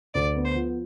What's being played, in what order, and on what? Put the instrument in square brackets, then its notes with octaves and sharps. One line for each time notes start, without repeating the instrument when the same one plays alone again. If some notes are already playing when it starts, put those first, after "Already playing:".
[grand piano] D2 [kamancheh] D5
[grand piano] B3
[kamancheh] C5
[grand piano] F3